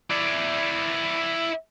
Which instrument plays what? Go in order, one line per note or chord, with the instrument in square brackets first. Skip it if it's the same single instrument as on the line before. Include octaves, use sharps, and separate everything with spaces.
[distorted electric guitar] E4 D5